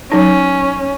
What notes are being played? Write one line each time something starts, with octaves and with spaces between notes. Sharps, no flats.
F#3 C#4 D#4